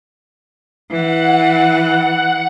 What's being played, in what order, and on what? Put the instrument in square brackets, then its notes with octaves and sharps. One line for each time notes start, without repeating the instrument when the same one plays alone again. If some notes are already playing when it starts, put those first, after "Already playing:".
[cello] E3 [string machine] F#5